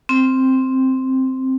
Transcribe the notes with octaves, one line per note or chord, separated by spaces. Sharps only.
C4